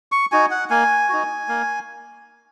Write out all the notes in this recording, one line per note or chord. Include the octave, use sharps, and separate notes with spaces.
C#6
D#4 F#4 G#5
F#5
A#3 G#5
D#4 F#4
A#3